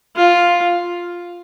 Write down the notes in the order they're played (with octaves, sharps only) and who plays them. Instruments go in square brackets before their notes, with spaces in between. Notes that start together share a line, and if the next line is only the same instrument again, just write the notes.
[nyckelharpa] F4